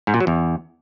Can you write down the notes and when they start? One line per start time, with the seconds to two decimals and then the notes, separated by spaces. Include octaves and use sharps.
0.07 G#2
0.14 A#2
0.20 F#3
0.27 E2